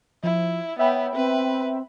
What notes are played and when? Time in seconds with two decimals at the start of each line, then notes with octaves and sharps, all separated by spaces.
0.23 F3 E4
0.79 B3 C#5 E5 G5 B5
1.16 C4 B4